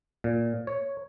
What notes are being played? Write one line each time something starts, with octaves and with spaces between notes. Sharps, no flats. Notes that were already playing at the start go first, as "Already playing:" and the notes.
A#2
C#5